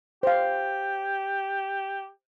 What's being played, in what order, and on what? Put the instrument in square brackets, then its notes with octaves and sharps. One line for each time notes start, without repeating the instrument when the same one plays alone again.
[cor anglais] G4 [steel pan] C5 F5